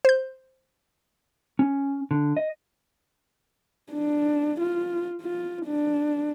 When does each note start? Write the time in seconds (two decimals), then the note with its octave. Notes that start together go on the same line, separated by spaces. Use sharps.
0.05 C5 G6
1.59 C#4
2.11 D3
2.37 D#5
3.93 D4
4.60 F4
5.22 F4
5.66 D4